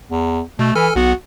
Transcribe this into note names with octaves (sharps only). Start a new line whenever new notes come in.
E2
B2 A3
E3 A4 G#5 F6
B1 B3 F#4